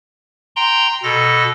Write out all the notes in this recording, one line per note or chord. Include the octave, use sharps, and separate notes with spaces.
G5 A#5 C6
B2 A4 A#6